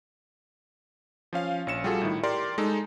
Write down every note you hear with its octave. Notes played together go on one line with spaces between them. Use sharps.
F3 C#4 F5
A#1 C#4 C#7 E7
G3 F4 F#4 G#4 A4
A2 D#3 E4
G4 A#4 D5 C6
G#3 D#4 A4